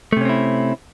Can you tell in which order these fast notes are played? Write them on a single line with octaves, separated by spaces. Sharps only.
A3 C3 C#4 C4 E4